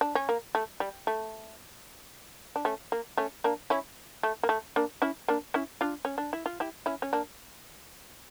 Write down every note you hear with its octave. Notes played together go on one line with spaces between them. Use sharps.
D4
C#4
A#3
A3
G3
A3
D4
A3 C#4
A#3
A3 C#4
A#3 D4
C#4 E4
A3
A#3
A3
A#3 D4
C#4 E4
A#3 D4
C#4 E4
D4 F4
C#4
D4
E4
F4
E4 G4
C#4 E4
C#4
A#3 D4